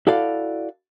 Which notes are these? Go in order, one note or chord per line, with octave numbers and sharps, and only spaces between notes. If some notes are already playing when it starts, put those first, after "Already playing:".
E4 F#4 A4 D5 F5